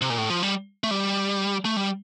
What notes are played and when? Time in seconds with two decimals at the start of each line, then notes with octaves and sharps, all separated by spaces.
0.02 C3
0.10 A#2
0.18 A2
0.30 F3
0.43 G3
0.84 A3
0.91 G3
1.65 A3
1.76 G3